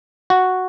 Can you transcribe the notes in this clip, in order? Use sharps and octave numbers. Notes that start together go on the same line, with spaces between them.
F#4